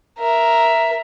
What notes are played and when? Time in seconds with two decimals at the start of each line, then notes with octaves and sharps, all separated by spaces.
0.18 A#4 E5